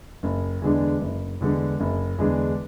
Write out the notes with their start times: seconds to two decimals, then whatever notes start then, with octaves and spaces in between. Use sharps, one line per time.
0.23 F#1
0.62 E2 D3 G#3 D4
1.01 F#1
1.41 E2 D3 G#3 D4
1.80 F#1
2.18 E2 D3 G#3 D4